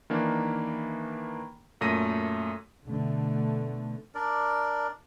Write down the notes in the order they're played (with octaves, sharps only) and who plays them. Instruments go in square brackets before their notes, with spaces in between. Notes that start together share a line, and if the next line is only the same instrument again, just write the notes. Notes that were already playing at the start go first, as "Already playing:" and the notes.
[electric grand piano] D#3 E3 A#3 D4
F#2 A#2 A3 A#6 D#7
[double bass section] B2 D3 A3
[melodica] D4 A#4 D5